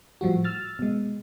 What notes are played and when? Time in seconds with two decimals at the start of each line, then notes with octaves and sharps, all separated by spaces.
0.21 A2 F3 G3 F#4
0.44 E6 F6 A6
0.79 B2 G#3